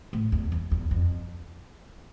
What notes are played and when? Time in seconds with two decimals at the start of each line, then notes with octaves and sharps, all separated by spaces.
0.13 A2
0.32 E2
0.52 E2
0.71 E2
0.91 F2